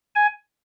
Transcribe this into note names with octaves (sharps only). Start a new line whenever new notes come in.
G#5